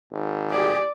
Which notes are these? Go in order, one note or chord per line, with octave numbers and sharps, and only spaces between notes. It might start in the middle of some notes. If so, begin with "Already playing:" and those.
G#1
G4 G#4 D5